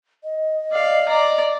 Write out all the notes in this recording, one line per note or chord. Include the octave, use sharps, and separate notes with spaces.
D#5
D5 F5
D5 A#5